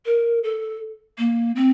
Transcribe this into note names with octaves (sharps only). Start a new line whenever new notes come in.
A#4
A4
A#3
C4